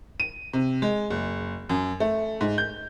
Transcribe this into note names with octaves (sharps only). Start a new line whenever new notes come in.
D#7
C3
G#3
F#1
F#2
A3
G#2
G6